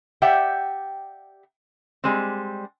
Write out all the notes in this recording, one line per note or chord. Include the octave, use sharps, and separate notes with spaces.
G4 D5 E5 F#5 G5
G3 G#3 C4